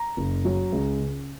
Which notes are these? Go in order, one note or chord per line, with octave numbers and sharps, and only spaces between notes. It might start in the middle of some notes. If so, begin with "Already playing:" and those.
Already playing: A#5
F#1
F#3
C#2
C#3